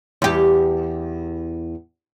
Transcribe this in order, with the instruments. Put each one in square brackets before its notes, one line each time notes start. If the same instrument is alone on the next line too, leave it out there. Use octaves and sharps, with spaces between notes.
[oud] E2 G4